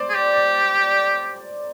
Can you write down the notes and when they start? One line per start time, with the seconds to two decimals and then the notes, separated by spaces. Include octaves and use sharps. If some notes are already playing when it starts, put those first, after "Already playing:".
Already playing: C5 D5
0.10 G#4
0.15 G4